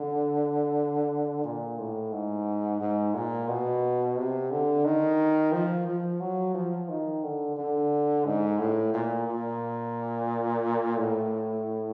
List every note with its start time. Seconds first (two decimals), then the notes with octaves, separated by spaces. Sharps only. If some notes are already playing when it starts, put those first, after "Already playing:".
Already playing: D3
1.44 A#2
1.79 A2
2.12 G#2
2.81 G#2
3.14 A#2
3.48 B2
4.17 C3
4.51 D3
4.85 D#3
5.52 F3
5.87 F3
6.20 F#3
6.54 F3
6.89 D#3
7.24 D3
7.57 D3
8.26 G#2
8.59 A2
8.94 A#2
9.27 A#2
10.98 A2